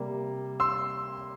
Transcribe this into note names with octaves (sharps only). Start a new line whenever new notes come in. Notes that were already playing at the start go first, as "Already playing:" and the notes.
Already playing: C3 G3 A#3
C6 E6